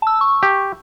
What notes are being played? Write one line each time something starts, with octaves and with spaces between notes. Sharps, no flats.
A5 E6
C#6
G4